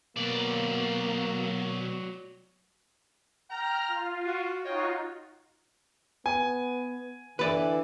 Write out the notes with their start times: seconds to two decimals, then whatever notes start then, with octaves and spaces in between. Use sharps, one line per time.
0.16 B2 F#3 A#3 D5
3.50 G5 A#5 F6
3.88 F4
4.25 F#4
4.64 D#4 F4 F#4 C#5 D#5 G5
6.26 B3 G#5
7.39 D3 E3 B4 D5